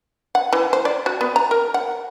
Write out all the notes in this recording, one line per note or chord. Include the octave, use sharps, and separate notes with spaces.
F#5
E3
C5
D5
F#4
B3
A#5
A#4
F#5